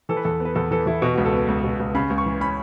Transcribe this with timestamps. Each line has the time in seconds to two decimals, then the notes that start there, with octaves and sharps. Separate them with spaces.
0.09 E3 A4
0.17 B4
0.25 E2 A4
0.40 B3
0.45 B4
0.55 E2 A4
0.71 E3 A4
0.86 E2 E4
1.02 B2 F#4
1.14 C#2 F#4
1.25 A4
1.33 B3
1.48 C#2
1.64 B2
1.80 C#2
1.95 C#3 B5
2.10 C#2
2.18 C#6
2.26 E3
2.41 C#4 B5